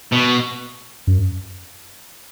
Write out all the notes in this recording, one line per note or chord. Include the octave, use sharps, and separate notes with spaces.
B2
F#2